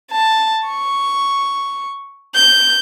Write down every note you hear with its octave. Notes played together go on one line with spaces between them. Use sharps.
A5
C#6
G6